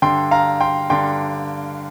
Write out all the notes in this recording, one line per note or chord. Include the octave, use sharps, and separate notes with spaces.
G2 D3 G5 C6
F5 A#5
G5 C6
G2 D3 G5 C6